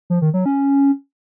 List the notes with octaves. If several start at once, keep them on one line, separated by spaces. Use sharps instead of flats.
F3
D#3
F#3
C#4